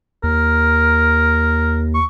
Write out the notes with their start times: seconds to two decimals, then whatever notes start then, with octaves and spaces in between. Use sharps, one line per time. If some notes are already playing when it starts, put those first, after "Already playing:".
0.23 D#2 A#4
1.94 C#6